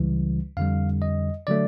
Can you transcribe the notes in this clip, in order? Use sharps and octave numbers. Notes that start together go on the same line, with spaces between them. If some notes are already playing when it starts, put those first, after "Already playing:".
Already playing: C#2 C#3 E3 G3
F2 D3 G3 F5
D#5
D3 F#3 A3 D5